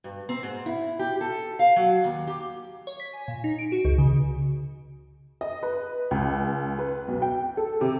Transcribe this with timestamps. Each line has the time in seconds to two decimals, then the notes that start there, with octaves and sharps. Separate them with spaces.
0.04 G2
0.29 C4
0.43 G#2
0.66 E4
0.99 G4
1.21 A4
1.59 F5
1.76 F#3
2.04 D#2
2.27 G4
2.87 C#5
3.00 B6
3.13 G#5
3.28 A#2
3.44 D#4
3.59 D7
3.72 F#4
3.85 C#2
3.98 C#3
5.41 D#5
5.63 B4
6.11 C#2
6.79 B4
7.08 B1
7.22 G5
7.57 A4
7.81 C3